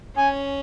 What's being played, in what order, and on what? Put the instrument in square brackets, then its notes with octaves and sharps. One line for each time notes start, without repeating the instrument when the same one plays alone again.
[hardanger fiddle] C#4 [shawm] G#5